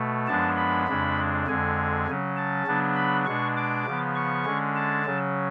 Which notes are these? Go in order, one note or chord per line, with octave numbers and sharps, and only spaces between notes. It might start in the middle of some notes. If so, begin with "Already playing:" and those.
Already playing: B2 A3
F#2 F3 G#3 B3 D4 A5
B5
F2 C#3 G#3 D4
F2 D3 G#3 G#5
C#3 F#3 C#4
A5
C#3 F#3 B3 D4
B5
B2 G#3 D4 C#6
D6
C#3 F3 B3
C#6
D3 G#3 C#4
A5
C#3 F#3 C#4